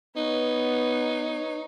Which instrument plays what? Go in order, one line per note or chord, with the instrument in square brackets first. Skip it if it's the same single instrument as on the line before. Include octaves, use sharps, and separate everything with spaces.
[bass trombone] B3 [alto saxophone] D#4 [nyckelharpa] B4 C#5